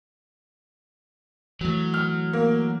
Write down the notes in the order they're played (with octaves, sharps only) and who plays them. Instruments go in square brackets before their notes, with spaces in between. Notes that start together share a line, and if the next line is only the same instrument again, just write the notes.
[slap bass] E3 A3 [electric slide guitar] F#3
[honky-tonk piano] F6
A#3